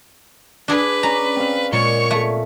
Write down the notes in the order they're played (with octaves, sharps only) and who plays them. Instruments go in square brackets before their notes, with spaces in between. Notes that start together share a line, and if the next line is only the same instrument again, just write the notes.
[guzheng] D4 G#4 [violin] B4
[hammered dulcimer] C#4 D5 [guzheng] A#5
[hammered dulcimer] C4 F5
[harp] A#2 G#3 D5 [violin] C#5 C#6
[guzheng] A3